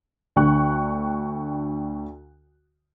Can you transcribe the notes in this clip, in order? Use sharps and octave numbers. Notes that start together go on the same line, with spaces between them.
D2 D3 G5 C#6 F#6